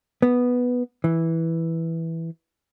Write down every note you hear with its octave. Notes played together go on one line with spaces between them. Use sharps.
B3
E3